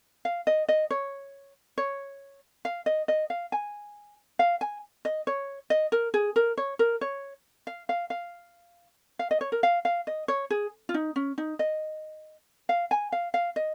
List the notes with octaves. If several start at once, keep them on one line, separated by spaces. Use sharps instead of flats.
F5
D#5
D#5
C#5
C#5
F5
D#5
D#5
F5
G#5
F5
G#5
D#5
C#5
D#5
A#4
G#4
A#4
C#5
A#4
C#5
F5
F5
F5
F5
D#5
C#5
A#4
F5
F5
D#5
C#5
G#4
F4
D#4
C#4
D#4
D#5
F5
G#5
F5
F5
D#5